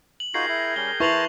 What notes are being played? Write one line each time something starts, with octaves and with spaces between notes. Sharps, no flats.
F#7
D#4 F4 F#4 G#4 A#4 G5 C7
E4
G3 C#4 G7
E4 B4 A5 C6 C#6 F7 F#7